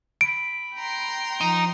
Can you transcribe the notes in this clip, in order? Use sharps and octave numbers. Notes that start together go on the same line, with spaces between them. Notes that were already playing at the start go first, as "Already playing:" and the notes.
B5 D7
G5 A#5 C6
F3 D#4